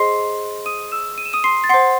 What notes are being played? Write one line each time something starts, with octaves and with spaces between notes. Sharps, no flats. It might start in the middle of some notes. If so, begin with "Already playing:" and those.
Already playing: G#4 C5 D#5 C6 C7
D#6 D#7
E6 E7
D#7
E7
D#6 D#7
C6 C7
A6
C5 F#5 C6 C7